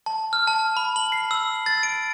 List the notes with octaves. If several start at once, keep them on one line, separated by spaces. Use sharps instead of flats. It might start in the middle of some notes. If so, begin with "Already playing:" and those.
A5
F6
A5
B5
F#7
C7
E6
A6
D7